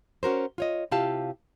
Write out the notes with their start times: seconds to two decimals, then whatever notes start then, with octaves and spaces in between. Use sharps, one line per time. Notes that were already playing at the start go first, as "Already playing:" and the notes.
0.23 C#4 F#4 A#4 C5
0.58 F4 C#5 D#5
0.91 C3 E4 F4 G4 F5 A5